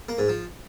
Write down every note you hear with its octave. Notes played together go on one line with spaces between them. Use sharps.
A#3
G#2
F3